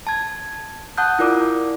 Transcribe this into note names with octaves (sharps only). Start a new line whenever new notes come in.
A5 G#6
F#5 A5 D#6 F#6 G6
E4 F4 A#4 D5 D6